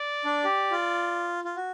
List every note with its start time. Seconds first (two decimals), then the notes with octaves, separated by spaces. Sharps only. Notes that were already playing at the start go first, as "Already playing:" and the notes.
Already playing: D5
0.25 D4
0.44 G4
0.71 F4
1.45 F4
1.56 F#4